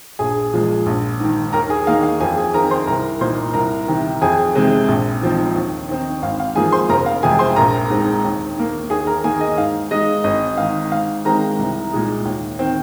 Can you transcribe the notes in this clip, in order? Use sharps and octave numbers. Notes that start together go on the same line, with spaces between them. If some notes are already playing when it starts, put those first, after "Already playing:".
A#1 G#4 G#5
A#2 F3 G#3
A#1
G#2 D#3
D#2 A#4 A#5
G#4 G#5
D#3 A#3 D#4 F5
F5
F2 G#4 G#5
G#4 G#5
D#3 C4 D#4 A#4 A#5
C5 C6
C2 A#4 A#5
A#2 A#3 D#4 C5 C6
C2 A#4 A#5
C3 D#3
F2 G#4 G#5
C3 G#3 C4 D#4
A#1
G#2 F3 C4 D#4
D#2
D#3 C4 D#4
G#1 F5
F5
G#2 F3 A#3 G#4 G#5
C5 C6
F1 A#4 A#5
F5
F2 C3 G#3 G#4 G#5
C5 C6
A#1 A#4 A#5
G#2 G#3 C4 D#4
D#2
D#3 A#3
D#2 G#4 G#5
A#4 A#5
D#3 A#3 G#4 G#5
D#5
G#2 F5
G#3 D#4 D#5
G#1 D#5
G#2 D#3 F5
G#2 F5
D#3 G#3 C4 A#4 A#5
C2
A#2 G#3 D#4
D#2
D#3 C4